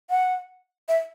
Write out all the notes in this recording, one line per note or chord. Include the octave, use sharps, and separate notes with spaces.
F#5
E5